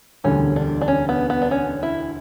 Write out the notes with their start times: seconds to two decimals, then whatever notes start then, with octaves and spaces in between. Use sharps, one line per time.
0.24 E1 D2 D3 G3 C#4
0.56 D4
0.81 D4
0.88 C#4
1.09 B3
1.30 B3
1.42 D4
1.51 C#4
1.83 E4